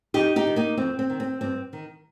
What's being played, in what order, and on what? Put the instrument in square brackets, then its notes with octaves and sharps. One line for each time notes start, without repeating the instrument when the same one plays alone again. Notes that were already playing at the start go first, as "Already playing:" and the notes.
[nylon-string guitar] F2 D#4 G4
D#4 G4
D#3
A#3 D#4
F2 C4
C4
D#3
C4
G2 C4
D#3